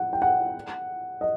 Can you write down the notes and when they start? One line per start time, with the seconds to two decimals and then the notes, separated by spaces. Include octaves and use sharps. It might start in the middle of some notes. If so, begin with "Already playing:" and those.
Already playing: F#5
0.13 G5
0.22 F#5
1.21 D#5